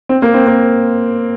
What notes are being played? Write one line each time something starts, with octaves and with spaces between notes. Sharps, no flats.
C4
A#3
C4
A#3